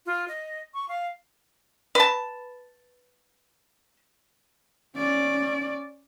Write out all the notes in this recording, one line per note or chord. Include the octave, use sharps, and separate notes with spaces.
F4
D#5
C#6
F5
B4 A5
C#4 D5